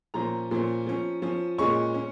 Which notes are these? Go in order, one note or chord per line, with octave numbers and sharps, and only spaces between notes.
A#2 F3 C#4 A#5
A#2 F3 C#4
F3 C#4
F3 C#4
A#2 G#3 C#4 C#6
C#4